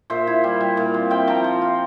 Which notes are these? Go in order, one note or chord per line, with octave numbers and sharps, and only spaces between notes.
A#2 C5 E5
E4
G3
G3
A#2
C4
C4 E5 G5
F3 G5 A#5
F3
F4